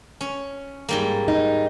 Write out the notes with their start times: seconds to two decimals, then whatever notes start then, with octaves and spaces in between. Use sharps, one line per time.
0.21 C#4
0.89 G#2 G3 A#3
1.28 D#4